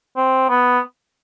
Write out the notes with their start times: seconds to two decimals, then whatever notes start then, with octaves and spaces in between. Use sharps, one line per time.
0.16 C4
0.49 B3